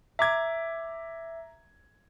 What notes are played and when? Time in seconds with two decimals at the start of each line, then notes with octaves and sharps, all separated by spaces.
0.19 E5 A#5 D6 G#6